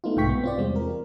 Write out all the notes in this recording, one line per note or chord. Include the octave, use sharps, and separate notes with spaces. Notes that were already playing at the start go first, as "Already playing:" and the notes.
A3 B3 D#4 F4
B1 G#2 C3 G5 C#6 B6
B3
C4 F4 D5
E2 C3 G3 G#3 C4
F4 A#4